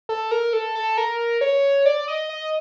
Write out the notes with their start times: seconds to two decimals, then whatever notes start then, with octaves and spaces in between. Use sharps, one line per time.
0.09 A4
0.31 A#4
0.53 A4
0.75 A4
0.97 A#4
1.41 C#5
1.86 D5
2.08 D#5
2.29 D#5